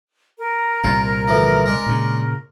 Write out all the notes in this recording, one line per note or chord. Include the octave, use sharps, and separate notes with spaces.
A#4
C2 A#2 F4
D2 E3 F3
G#3 D4
A#2 C#3